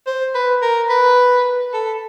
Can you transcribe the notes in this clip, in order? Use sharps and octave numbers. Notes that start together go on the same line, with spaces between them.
C5
B4
A#4
B4
A4